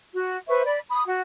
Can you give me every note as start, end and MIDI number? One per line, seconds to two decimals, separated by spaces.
0.13 0.36 66
0.48 0.62 71
0.48 0.62 72
0.48 0.62 76
0.48 0.62 85
0.64 0.80 74
0.64 0.80 83
0.89 1.02 83
0.89 1.02 87
1.05 1.21 66
1.05 1.21 78